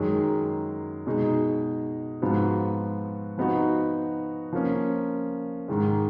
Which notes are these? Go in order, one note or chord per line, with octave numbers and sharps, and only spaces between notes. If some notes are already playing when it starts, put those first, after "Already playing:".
Already playing: F#2 D#3 G#3
B2 G#3 D#4
G#2 F3 B3 F#4
F3 B3 D#4 F#4
F3 A#3 C#4
G#2 D#3 G#3